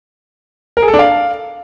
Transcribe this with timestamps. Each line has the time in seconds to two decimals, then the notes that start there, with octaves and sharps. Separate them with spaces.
0.77 A#4
0.82 G#4
0.88 A4
0.94 D4
0.99 F5